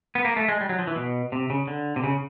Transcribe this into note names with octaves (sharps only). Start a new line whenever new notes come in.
B3
A#3
A3
G#3
G3
F#3
F3
E3
B2
C3
C#3
D3
C3
C#3